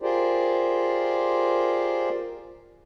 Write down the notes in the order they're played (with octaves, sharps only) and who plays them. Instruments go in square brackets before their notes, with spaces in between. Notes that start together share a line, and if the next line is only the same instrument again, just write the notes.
[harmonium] F4 G4 G#4 A#4 C5 D5